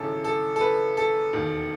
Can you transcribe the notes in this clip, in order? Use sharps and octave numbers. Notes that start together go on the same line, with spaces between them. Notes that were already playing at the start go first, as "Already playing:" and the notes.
Already playing: G#1 F#2 C#3 E3 A4
A4
A4
B4
A4
E1 D#2 D#3